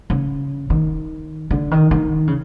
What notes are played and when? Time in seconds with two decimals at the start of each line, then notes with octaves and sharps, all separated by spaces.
0.10 C#3
0.70 D#3
1.51 D3
1.71 D#3
1.91 D#3
2.27 C#3